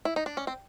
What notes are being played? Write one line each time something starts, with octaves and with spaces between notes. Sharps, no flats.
E4
D#4
D4
C#4
C4